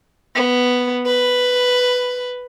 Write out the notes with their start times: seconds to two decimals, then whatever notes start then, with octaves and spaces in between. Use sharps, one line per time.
0.36 B3
1.06 B4